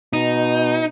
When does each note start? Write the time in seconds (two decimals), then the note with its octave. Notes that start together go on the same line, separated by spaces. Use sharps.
0.13 B2 D#4